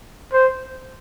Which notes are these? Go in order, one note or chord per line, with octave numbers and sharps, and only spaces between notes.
C5